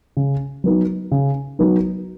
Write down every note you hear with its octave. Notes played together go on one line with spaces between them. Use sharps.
C#3
F#3 B3 D#4
C#3
F#3 B3 D#4